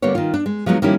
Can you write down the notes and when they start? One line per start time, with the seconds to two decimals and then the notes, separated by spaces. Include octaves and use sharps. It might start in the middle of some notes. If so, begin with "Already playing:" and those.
0.02 D3 G3 A#3 B3 C#5
0.15 D#3 F4
0.34 D4
0.46 G#3
0.66 F3 F#3 G#3 B3 D#4
0.82 D#3 F3 G3 A#3 C#4 E4